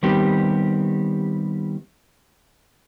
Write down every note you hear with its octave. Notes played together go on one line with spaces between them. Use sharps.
D#3 G3 B3 C4 G4